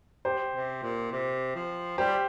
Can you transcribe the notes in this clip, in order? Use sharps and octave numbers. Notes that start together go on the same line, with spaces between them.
G4 C5
C3
A#2
C3
F3
G3 G4 C5